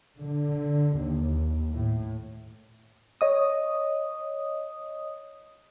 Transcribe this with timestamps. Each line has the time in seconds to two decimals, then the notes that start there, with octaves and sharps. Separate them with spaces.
0.20 D3
0.98 D#2
1.73 A2
3.21 C#5 D#5 D#6